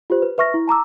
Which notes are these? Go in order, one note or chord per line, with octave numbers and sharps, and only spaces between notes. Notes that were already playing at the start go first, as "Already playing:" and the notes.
F4 G4 C5
B4
B4 E5 C#6 F6 A#6
E4
A5 A#5 D6 E6